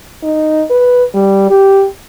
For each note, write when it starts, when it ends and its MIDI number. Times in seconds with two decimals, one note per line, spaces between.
0.23 0.63 63
0.70 1.06 71
1.14 1.47 55
1.50 1.86 67